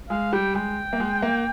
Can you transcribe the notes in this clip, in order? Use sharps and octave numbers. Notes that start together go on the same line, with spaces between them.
G#3 F5
G3 G5
G#3 G5
A#3
G#3
A#3